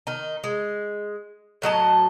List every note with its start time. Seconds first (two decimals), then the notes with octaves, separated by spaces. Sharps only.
0.07 D#3 D#4
0.44 G#3
1.62 A2 F#3 D#5 A5